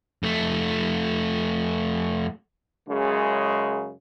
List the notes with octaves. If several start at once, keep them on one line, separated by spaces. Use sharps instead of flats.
F2 A3
F#2 C#3 G#3